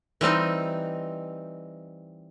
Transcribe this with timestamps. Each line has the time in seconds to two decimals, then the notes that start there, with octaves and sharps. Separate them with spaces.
0.21 E3 G3 C4 D#4